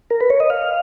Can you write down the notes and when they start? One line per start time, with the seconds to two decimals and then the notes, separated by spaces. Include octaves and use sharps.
0.10 A#4
0.20 B4
0.30 C#5
0.40 D#5
0.50 F5